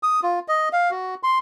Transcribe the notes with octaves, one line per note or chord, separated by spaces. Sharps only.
D#6
F4
D#5
F5
F#4
C6